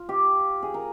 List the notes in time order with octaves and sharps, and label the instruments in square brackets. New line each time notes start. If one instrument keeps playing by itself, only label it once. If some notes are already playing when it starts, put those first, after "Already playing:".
Already playing: [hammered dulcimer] F4
G4
G#4
A#4